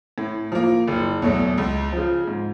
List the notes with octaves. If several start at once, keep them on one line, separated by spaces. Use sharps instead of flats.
A2
F3 A#3
F#1
E2 B2 F#3 A3
C#2
C#3 F3
G#2